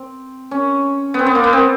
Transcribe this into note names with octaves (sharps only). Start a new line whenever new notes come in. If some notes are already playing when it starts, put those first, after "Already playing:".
Already playing: C4
C#4
B3 C4
B3
A#3
B3
C4